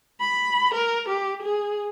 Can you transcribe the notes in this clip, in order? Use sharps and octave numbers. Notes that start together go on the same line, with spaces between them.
B5
A#4
G4
G#4